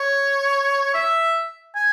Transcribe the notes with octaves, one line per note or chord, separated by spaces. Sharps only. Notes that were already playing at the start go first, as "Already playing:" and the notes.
Already playing: C#5
E5
G#5